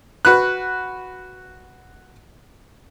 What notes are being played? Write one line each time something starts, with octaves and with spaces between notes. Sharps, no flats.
F#4 B4 F#6